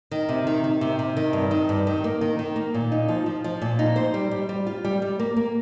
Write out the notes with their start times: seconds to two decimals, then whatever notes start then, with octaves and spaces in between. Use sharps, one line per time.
0.11 D#3
0.29 C3
0.47 D#3
0.64 D#3
0.81 C3
0.99 C3
1.17 D#3
1.33 G2
1.51 D#3
1.69 G2
1.87 D#3
2.04 A#3
2.21 D#3
2.39 D#3
2.56 A#3
2.74 A#2
2.92 D#4
3.08 F3
3.26 F3
3.44 F3
3.61 A#2
3.79 D#4
3.96 C5
4.14 G3
4.31 G3
4.49 G3
4.67 F4
4.84 G3
5.02 G3
5.20 A#3
5.36 A#3